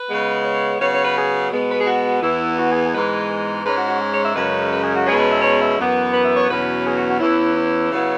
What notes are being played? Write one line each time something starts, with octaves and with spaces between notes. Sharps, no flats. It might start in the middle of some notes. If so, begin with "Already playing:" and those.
Already playing: B4
C#3 G#3 B3
C#5
C#3 F#3 B3 C#5
C#5
B4
G#4
B2 G#3 B3
B4
G#4
F#4
E2 E3 B3 E4
F#4
G#4
G#4
G#2 E3 G#3 B3 B4
G#2 G#3 C#4 B4
F#4
F#4
G#4
C#5
E5
F#2 C#3 G#3 C#4 B4
B4
G#4
F#4
E2 B2 G#3 C#4 G#4
B4
E5
C#5
E5
F#2 E3 B3
B4
E5
C#5
E2 B2 F#3 C#4 B4
G#4
F#4
F#4
E2 E3 C#4 E4
E4
C#3 F#3 B3